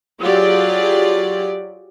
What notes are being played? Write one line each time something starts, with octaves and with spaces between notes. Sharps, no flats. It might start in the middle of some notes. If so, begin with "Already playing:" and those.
F#3 F4 G4 G#4 D5